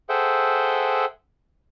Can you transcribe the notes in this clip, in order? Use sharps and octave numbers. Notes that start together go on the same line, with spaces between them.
G#4 A4 C5 E5 F#5 G5